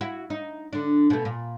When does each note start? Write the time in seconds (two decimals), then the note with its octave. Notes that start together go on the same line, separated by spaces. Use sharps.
0.01 E4 F#4
0.30 D#4
0.73 D3 D4
1.10 B2 A3
1.25 A#2